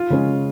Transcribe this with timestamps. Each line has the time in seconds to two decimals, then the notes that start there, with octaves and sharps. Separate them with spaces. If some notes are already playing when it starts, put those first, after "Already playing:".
Already playing: F4
0.10 C#3 G#3 C#4